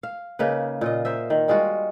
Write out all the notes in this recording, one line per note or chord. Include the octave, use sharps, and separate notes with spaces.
F5
C#3 A#3 D#4 B4
A#2 F4 D#5
A#4 C5 D#5 E5
D#3
G3 G#3 F4 F#4